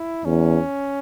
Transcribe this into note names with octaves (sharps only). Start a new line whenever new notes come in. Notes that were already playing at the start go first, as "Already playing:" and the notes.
Already playing: E4
E2 C#4